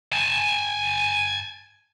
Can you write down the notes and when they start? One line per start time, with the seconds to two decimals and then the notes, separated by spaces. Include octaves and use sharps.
0.12 G#5 A5